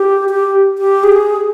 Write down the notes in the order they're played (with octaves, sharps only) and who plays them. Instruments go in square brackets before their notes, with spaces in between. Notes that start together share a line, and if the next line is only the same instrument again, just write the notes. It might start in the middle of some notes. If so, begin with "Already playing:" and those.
Already playing: [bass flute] G4
G4
G4
G#4